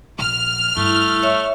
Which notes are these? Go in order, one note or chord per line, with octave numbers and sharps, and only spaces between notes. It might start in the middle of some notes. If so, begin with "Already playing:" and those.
A#1 F6
G2 A3 E4
C#5 E5 C#6